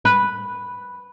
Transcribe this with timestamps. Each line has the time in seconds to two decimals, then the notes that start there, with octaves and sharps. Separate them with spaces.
0.05 B4